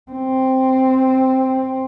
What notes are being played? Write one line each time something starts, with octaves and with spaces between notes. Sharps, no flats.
C4